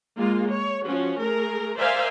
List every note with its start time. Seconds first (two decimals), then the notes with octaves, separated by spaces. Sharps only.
0.17 G#3 A#3 F4
0.50 C#5
0.87 F3 C#4 F#4
1.21 A3 G#4 A#4
1.78 A#4 C5 D5 E5 F5 G#5